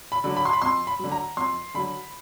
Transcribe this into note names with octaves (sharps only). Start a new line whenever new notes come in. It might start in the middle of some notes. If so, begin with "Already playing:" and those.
B5
D3 F#3
B5
C6
B5
F2 C6
B5
D3 F#3
A#5
F2 C6
D3 F#3 B5